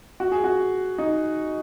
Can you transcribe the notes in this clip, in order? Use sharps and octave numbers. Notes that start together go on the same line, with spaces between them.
F#4
G#4
F#4
D#4